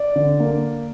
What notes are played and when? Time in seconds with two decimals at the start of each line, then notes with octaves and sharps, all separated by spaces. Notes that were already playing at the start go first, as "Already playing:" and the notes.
Already playing: D5
0.16 D3
0.40 A#3